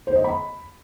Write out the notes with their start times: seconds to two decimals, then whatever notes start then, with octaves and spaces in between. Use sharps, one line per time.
0.07 C5
0.16 D#5
0.24 B5